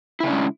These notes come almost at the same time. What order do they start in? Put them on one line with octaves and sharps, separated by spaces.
E4 C#3 D4 C#4 G#3